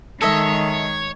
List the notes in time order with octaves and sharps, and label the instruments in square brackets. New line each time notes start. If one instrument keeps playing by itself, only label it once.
[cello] D#3 G#3 [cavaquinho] A4 D#5 E5 [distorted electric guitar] C#5